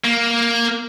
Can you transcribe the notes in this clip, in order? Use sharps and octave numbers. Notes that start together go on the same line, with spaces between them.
A#3